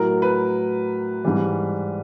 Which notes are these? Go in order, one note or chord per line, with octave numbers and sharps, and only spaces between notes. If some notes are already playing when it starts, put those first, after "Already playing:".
Already playing: A2 F#3 A#4
B4
G#2 E3 G3